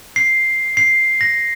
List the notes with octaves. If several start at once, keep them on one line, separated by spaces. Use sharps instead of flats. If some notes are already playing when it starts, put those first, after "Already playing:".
C7
C7
A#6